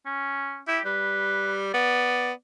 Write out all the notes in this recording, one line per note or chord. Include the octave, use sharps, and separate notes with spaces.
C#4
E4 G4
G3 B4
B3 D5